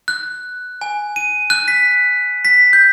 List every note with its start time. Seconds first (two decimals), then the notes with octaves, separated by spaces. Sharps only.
0.08 F#6
0.81 G#5
1.16 D#7
1.50 F#6
1.68 B6
2.45 B6
2.73 G6